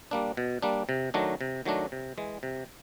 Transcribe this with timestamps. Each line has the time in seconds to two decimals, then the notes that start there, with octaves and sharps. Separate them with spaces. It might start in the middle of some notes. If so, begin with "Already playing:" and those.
0.11 G3 A#3 D4
0.37 B2
0.62 G3 A#3 D4
0.89 C3
1.14 D#3 F#3 A3 D4
1.41 C3
1.65 D#3 F#3 A3 D4
1.92 C3
2.18 E3 G#3
2.43 C3